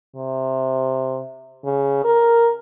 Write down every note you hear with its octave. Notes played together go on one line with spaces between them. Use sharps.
C3
C#3
A#4